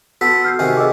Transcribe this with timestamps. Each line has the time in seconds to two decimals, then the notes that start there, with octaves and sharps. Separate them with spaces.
0.21 B3 F#4 A4 B6
0.44 F6 G6 C7
0.59 C3 D#3 F#4 G#5
0.77 G#4 A4 D#5 D6 E6